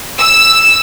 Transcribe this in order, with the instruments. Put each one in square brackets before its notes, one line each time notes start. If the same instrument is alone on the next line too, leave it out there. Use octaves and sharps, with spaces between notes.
[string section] E6